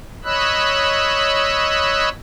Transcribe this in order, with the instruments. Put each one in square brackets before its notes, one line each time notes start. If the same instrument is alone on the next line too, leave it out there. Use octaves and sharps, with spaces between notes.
[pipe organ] C#5 D#5 B5 E6 F#6